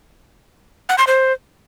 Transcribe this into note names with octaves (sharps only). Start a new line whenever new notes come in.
F#5
C6
C5